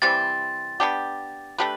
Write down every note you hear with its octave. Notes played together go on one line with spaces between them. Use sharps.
C3 E3 G3 C4 A6
B3 D4 G4
A3 D4 G4 B4